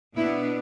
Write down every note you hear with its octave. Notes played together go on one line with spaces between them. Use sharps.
B2 B3 D4 E4